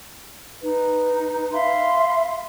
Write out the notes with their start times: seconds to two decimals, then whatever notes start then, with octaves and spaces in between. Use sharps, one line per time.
0.61 D#4 B4
1.51 E5 F5 B5 C6